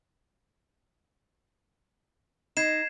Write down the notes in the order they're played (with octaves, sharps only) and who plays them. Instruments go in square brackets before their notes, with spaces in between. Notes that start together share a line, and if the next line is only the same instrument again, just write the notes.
[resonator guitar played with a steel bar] D#4 [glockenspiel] G#6 C7 E7